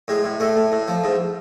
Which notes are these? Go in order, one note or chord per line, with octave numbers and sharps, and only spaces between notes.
A2 G#3
A2
A2 A3
A2
A2
F3
G#2